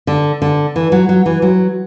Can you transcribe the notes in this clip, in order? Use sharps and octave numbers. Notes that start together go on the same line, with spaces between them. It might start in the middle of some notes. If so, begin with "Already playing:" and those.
D3
D3
E3
F#3
F#3
E3
F#3